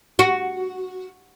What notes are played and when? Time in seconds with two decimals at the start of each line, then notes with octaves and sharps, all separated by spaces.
0.19 F#4